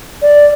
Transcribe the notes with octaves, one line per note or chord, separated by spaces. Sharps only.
D5